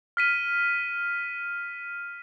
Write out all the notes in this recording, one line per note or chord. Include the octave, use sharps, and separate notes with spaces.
F6 B6 D#7